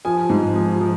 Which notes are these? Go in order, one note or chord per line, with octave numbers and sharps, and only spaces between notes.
F3 G#5
G#2
F3
F3